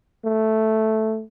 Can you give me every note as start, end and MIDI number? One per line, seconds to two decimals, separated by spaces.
0.25 1.23 57